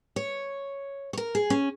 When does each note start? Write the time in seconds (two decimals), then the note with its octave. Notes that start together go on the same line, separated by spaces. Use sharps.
0.16 C#5
1.13 C#5
1.17 A#4
1.35 G#4
1.50 C#4